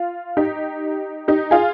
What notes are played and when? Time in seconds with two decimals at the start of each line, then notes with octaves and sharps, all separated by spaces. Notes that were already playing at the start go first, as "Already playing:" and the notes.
Already playing: F4
0.37 D#4 G4
1.28 D#4 G4
1.51 F4 G#4